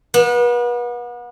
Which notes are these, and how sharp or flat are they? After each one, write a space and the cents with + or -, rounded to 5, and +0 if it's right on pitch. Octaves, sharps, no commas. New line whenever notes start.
B3 -35